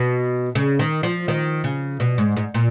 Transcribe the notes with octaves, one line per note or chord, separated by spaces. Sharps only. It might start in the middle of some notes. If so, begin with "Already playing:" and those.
Already playing: B2
C#3
D#3
F3
D#3
C#3
B2
G#2
G#2
A#2